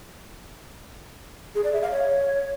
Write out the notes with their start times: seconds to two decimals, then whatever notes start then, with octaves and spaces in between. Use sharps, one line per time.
1.55 G#4
1.64 D5
1.73 E5
1.82 F5
1.91 C#5